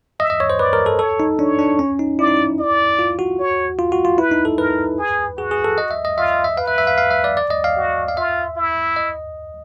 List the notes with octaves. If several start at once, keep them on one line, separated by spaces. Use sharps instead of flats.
D#5 E5
D#5
C#5
C5
B4 D5
A#4
A4
A4 C#5
D#4
D4 C#5
D4
C#4
D#4
E4 D5
D#4
E4
D5
F4
F#4
C#5
F4
F#4
F4
E4 B4
D#4
A4
A#4 B4
G#4
F#4 G#4
G#4
A4
D#5
E5
D#5
F4 E5
E5
B4 F5
E5
E5
F5
F5
E5
D5
D5
D#5
F5
F#4
F5
F4 E5
E4
D#5